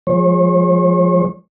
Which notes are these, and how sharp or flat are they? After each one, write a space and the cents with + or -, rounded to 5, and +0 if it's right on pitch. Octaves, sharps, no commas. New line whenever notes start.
F3 +15 G#3 +0 C#5 -40